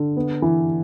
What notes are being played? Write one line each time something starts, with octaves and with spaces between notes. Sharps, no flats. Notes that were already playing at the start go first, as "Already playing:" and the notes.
Already playing: D3
B3
E3